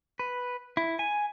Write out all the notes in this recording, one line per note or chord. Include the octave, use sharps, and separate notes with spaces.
B4
E4
G#5